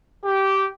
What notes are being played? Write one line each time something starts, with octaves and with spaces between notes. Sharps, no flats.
G4